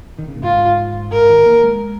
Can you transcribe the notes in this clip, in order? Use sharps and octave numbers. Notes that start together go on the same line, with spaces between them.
D#3
C#3
A#2
G#2 F4
G#2 A#4
D#3
A#3
G#3